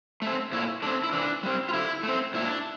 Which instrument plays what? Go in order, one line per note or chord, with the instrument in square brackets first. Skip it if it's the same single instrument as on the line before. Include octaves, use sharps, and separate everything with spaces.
[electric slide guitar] A3 C4
A#2 E4
A3 C4 D4
E4
E3 D4
G3 C4
F4
D3 E4
A3 C4
A#2 E4
D4